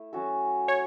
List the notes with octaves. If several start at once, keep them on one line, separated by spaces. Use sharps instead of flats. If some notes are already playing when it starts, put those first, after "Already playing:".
Already playing: A3 E4
F#3 C#4 F#4 A4
C#5